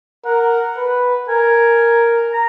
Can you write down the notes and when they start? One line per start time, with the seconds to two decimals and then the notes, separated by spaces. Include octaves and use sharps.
0.25 A#4 F#5
0.77 B4
1.29 A#4 G#5
2.33 A#5